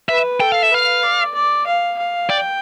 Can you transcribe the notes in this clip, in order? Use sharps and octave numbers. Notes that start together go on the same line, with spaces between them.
B4 E5
A4 G5
F5
E5
B4 F5
D5
D5
F5
F5
D5 G5